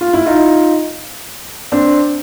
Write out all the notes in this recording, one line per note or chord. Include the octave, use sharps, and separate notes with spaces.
F4
E4
D#4 F4
C4 D4